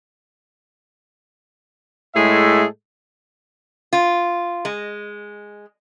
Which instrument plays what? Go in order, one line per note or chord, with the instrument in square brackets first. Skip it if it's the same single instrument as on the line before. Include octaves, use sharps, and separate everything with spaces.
[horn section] A2 G#3 G#4 A4 E5
[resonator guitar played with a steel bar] F4
G#3